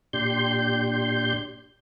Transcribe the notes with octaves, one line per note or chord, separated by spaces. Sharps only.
A#2 D4 G4 C6 G6